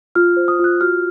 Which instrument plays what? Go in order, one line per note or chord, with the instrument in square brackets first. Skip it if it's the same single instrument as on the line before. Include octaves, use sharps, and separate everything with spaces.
[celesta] F4 F6
C5
D#6
F4 F#6
F#4 F6